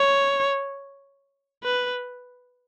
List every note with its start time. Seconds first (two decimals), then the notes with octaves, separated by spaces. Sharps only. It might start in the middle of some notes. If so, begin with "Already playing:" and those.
Already playing: C#5
1.64 B4